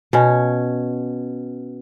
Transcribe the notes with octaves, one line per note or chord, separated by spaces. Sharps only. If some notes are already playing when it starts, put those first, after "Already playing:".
B2 C#4